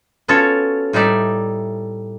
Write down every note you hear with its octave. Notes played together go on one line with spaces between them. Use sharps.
B3 C#4 F4 F#4 A4 C#5
A2 G3 D#4 D5 E5